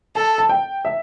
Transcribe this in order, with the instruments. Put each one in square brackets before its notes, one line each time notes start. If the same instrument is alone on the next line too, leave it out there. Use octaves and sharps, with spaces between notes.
[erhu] A4 [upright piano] A5
[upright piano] A5
G5
E5